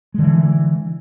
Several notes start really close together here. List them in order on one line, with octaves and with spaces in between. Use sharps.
G#3 D3 E3